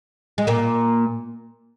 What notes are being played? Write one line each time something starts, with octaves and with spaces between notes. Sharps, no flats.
G#3
A#2 A#3